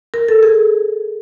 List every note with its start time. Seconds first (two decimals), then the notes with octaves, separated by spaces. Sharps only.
0.14 A#4
0.29 A4
0.43 G#4